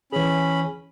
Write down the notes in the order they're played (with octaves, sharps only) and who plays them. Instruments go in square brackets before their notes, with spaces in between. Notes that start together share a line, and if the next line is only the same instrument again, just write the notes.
[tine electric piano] E3 G#4 [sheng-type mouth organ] C#4 B5